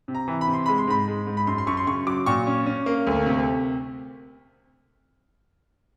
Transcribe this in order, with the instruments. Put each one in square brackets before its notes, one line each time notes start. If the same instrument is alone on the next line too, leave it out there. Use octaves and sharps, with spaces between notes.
[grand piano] C3
A#5
E3
B5
C3
C6
G#3 B5
C6
G#2 B5
G#3
G#2
B5
F#2 C6
C6
F#2 C#6
C6
C#3 C#6
F#3 D6
A#2 C#6
C#4
C#4
A#3
D2
C3